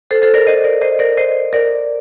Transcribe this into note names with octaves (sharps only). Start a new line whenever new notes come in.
A4 C5
A4 C5
A#4 D5
C5 D#5
A#4 D5
C5 D#5
A#4 D5
C5 D#5
A#4 D5